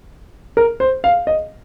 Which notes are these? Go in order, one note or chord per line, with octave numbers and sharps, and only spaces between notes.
A#4
C5
F5
D#5